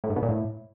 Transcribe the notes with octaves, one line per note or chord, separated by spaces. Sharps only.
A2
G#2
B2
A#2
A2